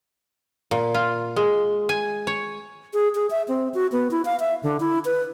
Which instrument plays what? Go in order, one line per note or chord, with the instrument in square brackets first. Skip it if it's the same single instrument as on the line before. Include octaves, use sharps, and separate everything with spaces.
[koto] A#2
F4
G#3
G#5
C#5
[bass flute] G#4
G#4
E5
C4
F#4
B3
E4
F5
E5
D3
E4
B4